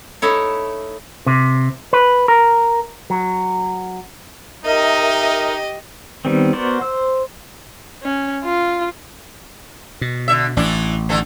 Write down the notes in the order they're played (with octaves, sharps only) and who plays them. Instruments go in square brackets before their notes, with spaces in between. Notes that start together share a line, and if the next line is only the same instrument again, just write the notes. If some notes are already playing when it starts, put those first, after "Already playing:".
[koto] A3 D#4 E4 C#5
[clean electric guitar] C3
B4
A#4
F#3
[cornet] D#4 [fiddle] G4 D#5 [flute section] A#4 E5
[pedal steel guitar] D#3 G3 B3 C4
B3 F#4 A#4 C5 D5
C5 E6
[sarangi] C#4
F4
[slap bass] B2
[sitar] D3 E5
[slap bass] A1 [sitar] E3 D4 E4
[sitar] D3 E3 A4